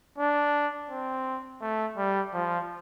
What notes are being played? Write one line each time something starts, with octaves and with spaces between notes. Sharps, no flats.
D4
C4
A3
G3
F3